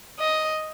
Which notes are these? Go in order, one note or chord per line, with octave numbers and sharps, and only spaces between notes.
D#5